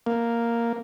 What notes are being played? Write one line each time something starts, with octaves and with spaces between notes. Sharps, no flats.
A#3